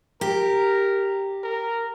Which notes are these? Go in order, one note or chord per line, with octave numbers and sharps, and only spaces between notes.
G4 A#4
A#4